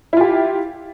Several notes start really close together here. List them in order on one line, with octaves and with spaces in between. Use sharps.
E4 F4 G4